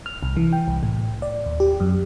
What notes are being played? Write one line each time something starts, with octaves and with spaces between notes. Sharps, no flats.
F6
C2
E3
G5
C2
A2
D5
D#2
G4
F#2